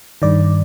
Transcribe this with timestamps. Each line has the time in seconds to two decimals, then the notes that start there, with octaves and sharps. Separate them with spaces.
0.22 G2 D#3 D5